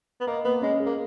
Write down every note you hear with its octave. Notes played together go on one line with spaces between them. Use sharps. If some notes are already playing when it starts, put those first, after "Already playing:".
B3
A#3 D#5
A#3 B3
G#3 C#4
G#4
A#3